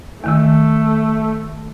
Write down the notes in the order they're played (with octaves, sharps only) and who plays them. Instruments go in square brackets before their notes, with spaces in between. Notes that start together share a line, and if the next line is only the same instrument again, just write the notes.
[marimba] E2 D#3 E6 [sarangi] A3